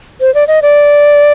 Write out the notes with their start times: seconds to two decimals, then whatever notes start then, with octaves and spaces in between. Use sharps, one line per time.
0.21 C5
0.34 D5
0.48 D#5
0.62 D5